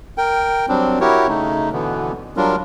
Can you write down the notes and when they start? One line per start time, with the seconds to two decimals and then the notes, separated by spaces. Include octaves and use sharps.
0.18 A#4 G5
0.69 F#3 G3 C4 D4
1.01 E4 F#4 G4 A#4 C#5
1.28 C#3 A3 D#4
1.73 B2 D3 E3 B3
2.37 F#3 G3 D4 F4 A#4